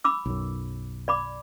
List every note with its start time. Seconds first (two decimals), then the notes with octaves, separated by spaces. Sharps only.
0.04 B5 D6 E6
0.26 B1 F#2
1.08 D5 B5 D6